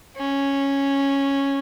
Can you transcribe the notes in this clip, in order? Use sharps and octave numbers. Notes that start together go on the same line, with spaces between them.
C#4